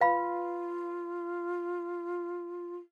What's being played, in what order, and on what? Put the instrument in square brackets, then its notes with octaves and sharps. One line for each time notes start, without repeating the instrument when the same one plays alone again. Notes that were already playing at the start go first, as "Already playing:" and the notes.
[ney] F4 [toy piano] B4 F5 B5